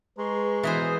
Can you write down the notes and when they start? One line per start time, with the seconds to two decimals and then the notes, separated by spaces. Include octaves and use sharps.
0.18 G#3 B4 A#5 C6 C#6
0.63 B2 E3 G#4 C5 G#5 D#6